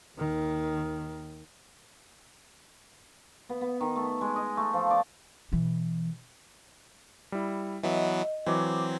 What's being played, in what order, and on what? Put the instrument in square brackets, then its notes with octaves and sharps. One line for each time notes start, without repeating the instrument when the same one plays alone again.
[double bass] D#2 D#3
[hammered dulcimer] B3
B3
D#3
A3
G#3
D#5
A3
F3
D5
[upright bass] B2 E3
[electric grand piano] G3 E4
[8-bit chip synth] E3 F#3 B3 [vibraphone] D#5 [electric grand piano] E5
[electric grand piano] E3 F#3 [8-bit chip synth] C4 [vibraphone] D6